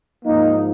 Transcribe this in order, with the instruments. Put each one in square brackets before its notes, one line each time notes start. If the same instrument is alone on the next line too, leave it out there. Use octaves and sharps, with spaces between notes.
[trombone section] G#2 F3 A#3 D#4